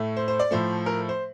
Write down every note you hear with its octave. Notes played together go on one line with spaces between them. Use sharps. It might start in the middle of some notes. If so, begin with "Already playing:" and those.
Already playing: A2 A3
C5
C5
D5
A2 F3 A3 C5
A#4
C5